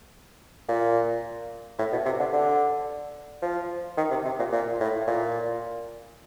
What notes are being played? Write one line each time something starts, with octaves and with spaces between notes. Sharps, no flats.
A#2
A2
B2
C3
D3
D3
F3
D#3
C3
C3
A#2
A#2
A2
A#2